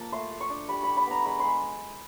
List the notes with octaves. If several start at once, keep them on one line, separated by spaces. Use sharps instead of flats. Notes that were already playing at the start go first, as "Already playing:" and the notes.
Already playing: F3 A#3 A5
A3 C6
A3
C#6
D4
G3 B5
G3 B5
B5
B3 A#5
G#3 B5
G#3 C6